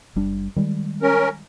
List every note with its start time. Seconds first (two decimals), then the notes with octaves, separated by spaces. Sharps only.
0.16 F#1 G3 D4
0.56 D#3 G3 G#3
1.02 C#4 A#4